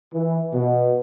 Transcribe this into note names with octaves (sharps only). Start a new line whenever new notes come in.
E3
B2